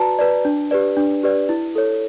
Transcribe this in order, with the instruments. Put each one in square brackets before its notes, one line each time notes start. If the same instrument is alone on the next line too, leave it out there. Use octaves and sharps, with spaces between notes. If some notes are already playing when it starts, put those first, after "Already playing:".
Already playing: [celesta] F#4 B4 D5 A5 A#5
B4 D5
D4
G4 B4 D5
D4
G4 B4 D5
E4
A4 C#5